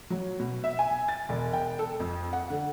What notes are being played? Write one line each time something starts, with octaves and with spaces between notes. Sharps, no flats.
F#3
B2
E5
G#5
A6
E1
G5
A4
F2
F#5
D3